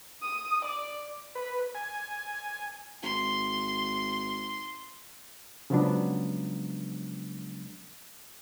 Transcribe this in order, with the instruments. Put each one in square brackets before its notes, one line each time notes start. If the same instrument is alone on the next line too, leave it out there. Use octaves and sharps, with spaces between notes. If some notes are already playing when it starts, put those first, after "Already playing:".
[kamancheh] D#6
D5
[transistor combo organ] B4
G#5
[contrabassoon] G#1 [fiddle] C6
[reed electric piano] C#3 F3 F#3 G#3 B3 D4